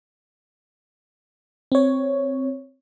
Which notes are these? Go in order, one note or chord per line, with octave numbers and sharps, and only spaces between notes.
C4 C#5